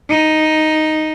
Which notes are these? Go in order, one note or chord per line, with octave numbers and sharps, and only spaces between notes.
D#4